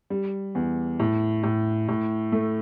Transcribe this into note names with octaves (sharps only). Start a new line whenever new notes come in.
G3
E2
A2
A2
A2
A3